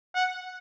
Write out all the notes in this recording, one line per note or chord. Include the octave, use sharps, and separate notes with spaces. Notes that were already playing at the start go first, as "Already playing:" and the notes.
F#5